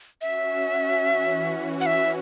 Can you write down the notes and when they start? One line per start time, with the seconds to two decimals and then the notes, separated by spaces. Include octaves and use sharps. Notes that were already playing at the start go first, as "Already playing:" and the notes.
0.21 C#4 F#4 E5
1.04 E3
1.80 F#5
1.86 E5